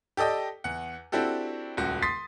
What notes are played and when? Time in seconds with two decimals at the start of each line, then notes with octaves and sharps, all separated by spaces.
0.17 G4 A4 D5 D#5 G5
0.64 E2 F#5
1.12 C4 D4 E4 F#4 G4 A4
1.77 D#1 C#2 F#4
2.02 C6 D#6 A6 B6 C7